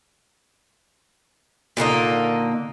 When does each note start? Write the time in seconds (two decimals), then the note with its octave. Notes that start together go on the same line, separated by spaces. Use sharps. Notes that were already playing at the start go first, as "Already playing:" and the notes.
1.77 A#2 D3 A#3 D#4